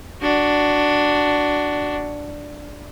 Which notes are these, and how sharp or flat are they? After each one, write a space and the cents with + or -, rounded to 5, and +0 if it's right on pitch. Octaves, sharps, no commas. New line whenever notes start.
D4 +0 F#4 +10